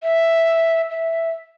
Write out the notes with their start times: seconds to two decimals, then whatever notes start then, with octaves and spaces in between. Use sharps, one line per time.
0.03 E5
0.91 E5